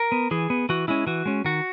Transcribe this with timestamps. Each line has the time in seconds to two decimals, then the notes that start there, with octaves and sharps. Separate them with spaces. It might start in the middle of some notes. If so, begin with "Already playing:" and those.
Already playing: A#4
0.12 B3
0.31 E3 G#4
0.50 B3
0.69 E3 F#4
0.88 G#3 C#4 E4
1.07 E3 F#4
1.26 G#3 C#4
1.45 D#3 F#4